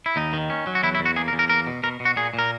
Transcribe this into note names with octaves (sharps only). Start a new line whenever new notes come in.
E4
D#2 D#4
D#3
C#4
F#3
F#4
E2 E4
E4
E2
F#4
A#3 G#4
A#4
E2
A#4
A#3 A#4
B2
B2 A#4
B2
F#4
A#2 G#4
A#2 A#4